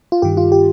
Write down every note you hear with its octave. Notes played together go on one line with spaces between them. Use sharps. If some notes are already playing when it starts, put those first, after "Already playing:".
F4
G2 D#3 G4
F4
G4